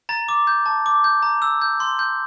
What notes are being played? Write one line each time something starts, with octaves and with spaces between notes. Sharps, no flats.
A#5 A6
D6
G6
A5
D6
G6
A#5
E6
G6
C6
G6